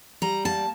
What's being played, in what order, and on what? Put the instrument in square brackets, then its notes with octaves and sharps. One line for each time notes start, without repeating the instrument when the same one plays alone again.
[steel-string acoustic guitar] G3 A#5
A#3 A5